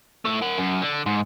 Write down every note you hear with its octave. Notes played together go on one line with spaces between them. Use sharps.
A3 E4
A#4 F#5
F#2
D3
G#2